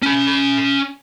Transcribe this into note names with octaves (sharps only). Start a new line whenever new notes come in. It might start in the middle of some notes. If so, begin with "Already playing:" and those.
C#4 B5